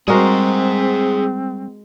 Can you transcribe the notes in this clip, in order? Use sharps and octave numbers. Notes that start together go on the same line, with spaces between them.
G3 G#3 C4 F#4 G#4 A#4 C5